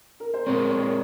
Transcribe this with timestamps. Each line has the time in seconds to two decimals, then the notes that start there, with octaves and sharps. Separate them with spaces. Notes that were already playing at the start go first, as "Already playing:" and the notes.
0.20 A#4
0.34 C5
0.47 A#2 G#3 C4 A#4 C#5
0.70 A#4 C#5